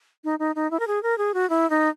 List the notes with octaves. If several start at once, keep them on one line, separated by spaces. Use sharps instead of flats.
D#4
D#4
D#4
E4
A#4
G#4
A#4
G#4
F#4
E4
D#4